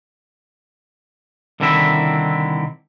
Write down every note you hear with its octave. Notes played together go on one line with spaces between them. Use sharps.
C2 D3 D#3 C4 E4 E5